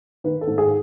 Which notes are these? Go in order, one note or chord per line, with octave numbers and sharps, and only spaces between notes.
D#3 B4
A4
G#2
G#4